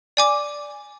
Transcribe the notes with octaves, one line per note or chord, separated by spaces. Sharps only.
D5 G#5 D6